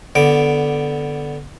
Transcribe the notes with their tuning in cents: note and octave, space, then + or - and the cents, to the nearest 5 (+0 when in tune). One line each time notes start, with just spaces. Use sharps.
D3 -5 B3 +0 D6 +0